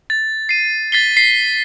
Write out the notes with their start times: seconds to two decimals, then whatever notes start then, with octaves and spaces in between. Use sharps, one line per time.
0.10 A6
0.49 C7 D#7
0.92 A6 B6 C7 G7
1.17 B6 C7